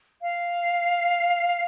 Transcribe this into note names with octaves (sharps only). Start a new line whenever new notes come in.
F5